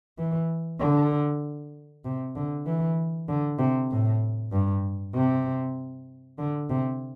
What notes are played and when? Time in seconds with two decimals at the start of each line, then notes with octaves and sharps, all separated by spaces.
0.18 E3
0.80 D3
2.05 C3
2.36 D3
2.66 E3
3.28 D3
3.59 C3
3.91 A2
4.52 G2
5.14 C3
6.38 D3
6.69 C3